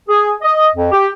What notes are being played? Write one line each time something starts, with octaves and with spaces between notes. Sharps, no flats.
G#4
D#5
F2
G4